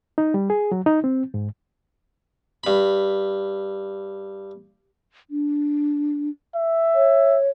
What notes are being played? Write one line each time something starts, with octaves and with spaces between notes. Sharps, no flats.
D#4
G3
G#4
F#3
D#4
C4
G#2
G2 B5
D4
E5
C#5